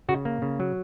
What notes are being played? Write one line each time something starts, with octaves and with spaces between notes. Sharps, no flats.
C#3 F#4
A#3
C#3
F#3